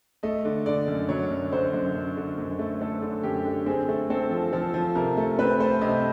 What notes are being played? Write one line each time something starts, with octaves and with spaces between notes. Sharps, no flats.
A3 D#5
D3
D3 D5
F#2
F#3 C#5
F#2
D3 C5
F#2
F#2
D3
F#2
A3
A3 A4
D3
F#2 G4
D3
C4 G#4
A3
C4 A4
F3
F3 A4
F3
C3 A#4
A3
C4 B4
A3 C5
C3 D#5